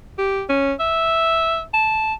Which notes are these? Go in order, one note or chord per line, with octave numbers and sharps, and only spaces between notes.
G4
C#4
E5
A5